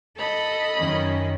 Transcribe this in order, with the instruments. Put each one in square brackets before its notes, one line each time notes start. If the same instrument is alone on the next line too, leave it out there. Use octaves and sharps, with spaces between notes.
[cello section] A4 [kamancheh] D#5 B5
[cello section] F#2 D#3 C#4